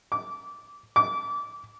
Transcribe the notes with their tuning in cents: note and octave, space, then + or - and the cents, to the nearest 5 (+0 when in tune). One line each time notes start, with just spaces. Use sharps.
D6 -20
D6 -25